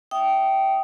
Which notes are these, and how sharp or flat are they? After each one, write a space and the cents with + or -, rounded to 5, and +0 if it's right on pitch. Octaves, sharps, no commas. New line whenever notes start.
E5 +0 G5 -15 D#6 +0